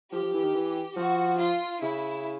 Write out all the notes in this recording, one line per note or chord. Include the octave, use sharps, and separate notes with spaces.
F3 G4
F3
E3
D#3
E3
F3 F#4
F4
C#3 E4